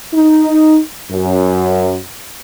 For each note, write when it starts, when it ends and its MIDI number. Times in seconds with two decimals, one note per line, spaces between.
0.13 0.78 63
1.10 1.96 42